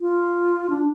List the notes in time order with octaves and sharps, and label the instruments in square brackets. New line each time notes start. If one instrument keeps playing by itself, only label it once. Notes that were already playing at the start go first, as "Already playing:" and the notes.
[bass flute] F4
D4